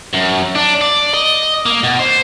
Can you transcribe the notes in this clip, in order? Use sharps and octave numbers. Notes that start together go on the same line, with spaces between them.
F#2
D4
D5
D#5
A#3
B2
C5